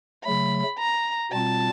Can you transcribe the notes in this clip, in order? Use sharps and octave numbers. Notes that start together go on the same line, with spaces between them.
C#3 F#3 A3 B5
A#5
B2 G3 C4 F4 A5